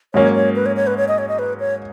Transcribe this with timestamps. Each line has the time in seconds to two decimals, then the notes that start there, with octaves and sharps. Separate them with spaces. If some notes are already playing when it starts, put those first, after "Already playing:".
0.14 G#2 F#3 A#3 C#4 C#5
0.35 C#5
0.56 B4
0.66 C#5
0.76 C#5
0.87 B4
0.98 C#5
1.08 D#5
1.18 C#5
1.29 D#5
1.39 B4
1.60 C#5